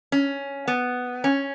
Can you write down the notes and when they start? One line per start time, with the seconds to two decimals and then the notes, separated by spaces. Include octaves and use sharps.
0.12 C#4
0.68 B3
1.24 C#4